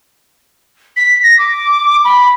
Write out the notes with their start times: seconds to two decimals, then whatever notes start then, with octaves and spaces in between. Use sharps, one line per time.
0.97 B6
1.23 A#6
1.38 D6
2.04 B5